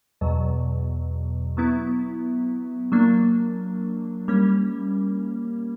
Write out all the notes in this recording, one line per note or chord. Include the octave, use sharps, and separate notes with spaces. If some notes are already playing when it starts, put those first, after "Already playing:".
E2 B2 F#3
F#3 B3 E4
F#3 A#3 D4
G3 A#3 C#4